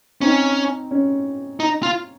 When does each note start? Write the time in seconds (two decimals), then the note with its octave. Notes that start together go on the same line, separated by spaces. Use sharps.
0.21 C4 C#4 D#4
0.91 C#4
1.60 D#4
1.83 F4